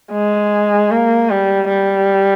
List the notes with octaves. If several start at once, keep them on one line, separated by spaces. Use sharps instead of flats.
G#3
A#3
G3
G3